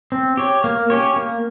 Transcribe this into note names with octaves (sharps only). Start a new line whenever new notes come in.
C4
G4 C#5
A#3
C#4 G4 C#5
A#3